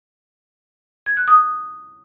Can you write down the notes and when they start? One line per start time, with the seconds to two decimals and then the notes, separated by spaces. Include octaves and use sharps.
1.06 G#6
1.17 F#6
1.28 D#6